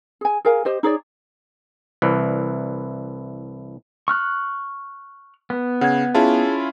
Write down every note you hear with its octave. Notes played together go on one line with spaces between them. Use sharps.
G#4 G#5
G#4 A#4 F5 G#5
G4 C5 D#5
D#4 G#4 C#5 D5
C2 E3
C#6 F6 F#6
B3
C#3 F#5 G#6
C#4 E4 F4 G#4 A5